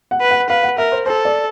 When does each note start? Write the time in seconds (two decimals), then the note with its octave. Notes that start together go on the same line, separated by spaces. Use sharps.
0.11 F#5
0.21 B4
0.31 F#5
0.50 B4 F5
0.63 F#5
0.78 A#4 E5
0.92 C5
1.06 A4 C5
1.25 D5